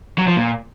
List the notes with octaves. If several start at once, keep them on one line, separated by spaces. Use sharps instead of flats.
F#3
F3
A#2